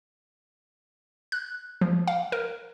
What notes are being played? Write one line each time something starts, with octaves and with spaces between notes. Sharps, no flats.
F#6
F3
F5
A#4